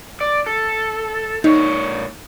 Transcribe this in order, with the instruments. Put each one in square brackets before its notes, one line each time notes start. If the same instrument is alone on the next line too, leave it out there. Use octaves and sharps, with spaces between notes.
[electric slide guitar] D5
A4
[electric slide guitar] A#2 C#5 [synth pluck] D#4